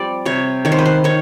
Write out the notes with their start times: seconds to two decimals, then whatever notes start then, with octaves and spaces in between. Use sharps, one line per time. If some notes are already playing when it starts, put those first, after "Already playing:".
Already playing: F3 G3 C4 D5
0.25 C3 C#5
0.65 D#3 C#5
0.72 C5
0.79 B4
0.85 C5
1.04 D#3 C#5